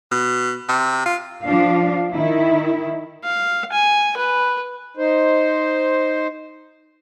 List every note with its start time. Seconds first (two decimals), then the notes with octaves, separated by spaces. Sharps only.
0.11 B2
0.69 C3
1.06 F4
1.45 F3 D4 F5
2.14 D#3 E4
3.24 F5
3.72 G#5
4.17 B4
4.97 D#4 C5